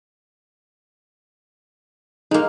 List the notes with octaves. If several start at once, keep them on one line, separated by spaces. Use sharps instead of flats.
G#3 A#3 D#4